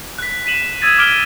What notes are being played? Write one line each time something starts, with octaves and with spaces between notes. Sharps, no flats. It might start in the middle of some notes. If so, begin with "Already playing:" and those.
F#6 B6
B6 D#7 E7 F#7
D#6 E6 G#6 A6 D#7
D6 F6 D7 G7